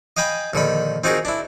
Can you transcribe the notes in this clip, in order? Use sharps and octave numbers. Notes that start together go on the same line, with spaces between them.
D#5 F5 G5 G#5 B5
A#1 D3 D#3 B5
C4 D#4 F4 F#4 G#4 A#4
D4 E4